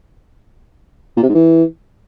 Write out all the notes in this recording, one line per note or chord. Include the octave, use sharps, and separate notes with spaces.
A#2
C3
G#2
E3